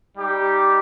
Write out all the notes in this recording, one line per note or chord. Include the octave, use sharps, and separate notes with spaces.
G3 D#4 G4